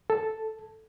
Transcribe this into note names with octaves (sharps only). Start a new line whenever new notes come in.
A4